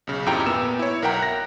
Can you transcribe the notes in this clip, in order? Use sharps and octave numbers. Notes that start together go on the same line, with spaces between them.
B1 C#3
G#1 F2 E4 G4 G5 A#5
A#2 B3 E6 E7
E4 C#5
B1 A#4 E5 F#5 G5 A#5
F#6 A#6